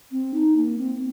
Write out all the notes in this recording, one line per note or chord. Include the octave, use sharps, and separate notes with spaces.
C4
D#4
A#3
C4